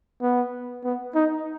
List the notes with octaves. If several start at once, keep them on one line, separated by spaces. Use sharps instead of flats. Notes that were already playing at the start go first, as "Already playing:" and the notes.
B3
B3
D#4